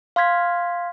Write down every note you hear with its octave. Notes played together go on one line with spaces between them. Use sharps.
F5 C6 F6 G#6 B6